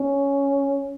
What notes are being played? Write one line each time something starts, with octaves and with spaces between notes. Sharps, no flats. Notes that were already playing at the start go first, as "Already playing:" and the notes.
Already playing: C#4